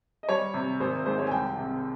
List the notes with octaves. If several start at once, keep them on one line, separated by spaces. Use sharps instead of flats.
D#5
G3 C#5
C3
G#1 C5
G#2 C5
C#5
G#5
C2 G5
C3